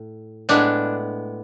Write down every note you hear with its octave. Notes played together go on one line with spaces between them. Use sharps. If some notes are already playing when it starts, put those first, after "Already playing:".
Already playing: A2
A2 G#3 B3 D4